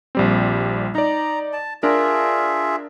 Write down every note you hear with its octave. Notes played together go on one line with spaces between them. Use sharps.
A#1 G3 C4
D#4 D5 A#5
A5
D4 F4 G#4 A#4 E5